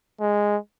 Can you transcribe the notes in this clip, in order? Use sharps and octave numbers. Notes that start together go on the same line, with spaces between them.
G#3